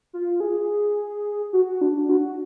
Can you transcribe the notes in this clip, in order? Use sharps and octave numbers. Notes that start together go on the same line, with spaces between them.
F4
G#4
F#4
D4
F#4